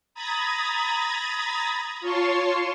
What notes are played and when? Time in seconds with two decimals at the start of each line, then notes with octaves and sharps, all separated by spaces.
0.14 A#5 B5 D#6 G#6 A6
2.01 F4 C#5 A5 C6 C#6